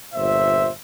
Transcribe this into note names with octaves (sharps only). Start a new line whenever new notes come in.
G1 A#2 C5 E5